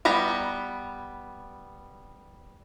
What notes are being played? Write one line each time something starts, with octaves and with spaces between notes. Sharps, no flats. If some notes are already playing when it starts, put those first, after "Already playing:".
G3 B3 A#5 B5